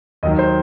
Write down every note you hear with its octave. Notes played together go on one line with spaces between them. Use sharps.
D#2 D#3 F#3 D#5
C5